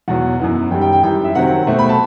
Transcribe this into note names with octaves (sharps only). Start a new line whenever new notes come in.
E2 B2 F#3 F#5
F#2 E3 B3
F#2 D#3 G3 G5
G5
G5
F#2 E3 G3 G5
E5
C3 D#3 F#3 C4 F#5
B2 A3 C4
B5
A5